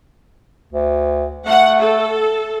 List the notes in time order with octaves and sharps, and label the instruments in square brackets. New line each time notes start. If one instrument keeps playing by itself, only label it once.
[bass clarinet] D2
[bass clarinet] A3 [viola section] F#5
[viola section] A4